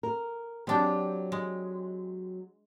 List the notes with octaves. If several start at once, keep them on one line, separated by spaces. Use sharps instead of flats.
A#4
F#3 G#3 C4 D4 G4 G5
G#3